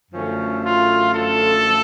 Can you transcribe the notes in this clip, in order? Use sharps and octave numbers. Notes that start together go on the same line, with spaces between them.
F#2 D3 F3 A3 C#4
F4
A4